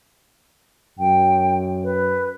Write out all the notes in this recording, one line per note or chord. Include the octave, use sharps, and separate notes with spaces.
F#2 G5
B4